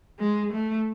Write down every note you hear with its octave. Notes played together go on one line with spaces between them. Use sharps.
G#3
A3